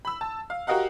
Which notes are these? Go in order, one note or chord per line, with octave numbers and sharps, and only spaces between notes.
B5 E6
A5
F5
F#4 G4 A#4 D#5 F5 F#5